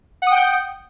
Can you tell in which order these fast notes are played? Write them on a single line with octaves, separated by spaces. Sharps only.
F#5 D#6 G5 G6